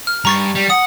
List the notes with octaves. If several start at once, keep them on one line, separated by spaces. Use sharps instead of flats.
F6
G2 A#5 C#6 A6
G3
F#5 D#6